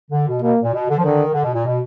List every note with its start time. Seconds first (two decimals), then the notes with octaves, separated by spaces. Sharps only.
0.11 D3
0.28 B2
0.42 B2 A#3
0.62 A#2
0.73 B2
0.89 D3
0.98 F3
1.03 D3 D#3
1.34 D3
1.44 B2
1.54 A#2
1.66 B2